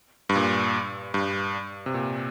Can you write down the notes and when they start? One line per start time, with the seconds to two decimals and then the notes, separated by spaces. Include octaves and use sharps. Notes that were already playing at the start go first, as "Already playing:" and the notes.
0.29 G2
0.35 A#2
1.14 G2
1.86 C3
1.94 A#2